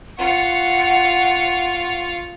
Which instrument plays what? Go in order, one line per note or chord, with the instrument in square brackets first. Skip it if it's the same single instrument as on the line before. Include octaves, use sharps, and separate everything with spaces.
[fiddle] F4 C#6 [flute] F#5